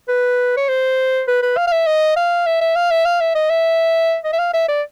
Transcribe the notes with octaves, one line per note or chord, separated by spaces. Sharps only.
B4
C#5
C5
B4
B4
F5
F5
E5
D#5
F5
E5
E5
F5
E5
F5
E5
D#5
E5
D#5
E5
F5
E5
D5